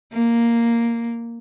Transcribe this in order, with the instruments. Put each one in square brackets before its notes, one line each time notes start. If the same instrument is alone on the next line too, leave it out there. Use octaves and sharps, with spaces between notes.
[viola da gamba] A#3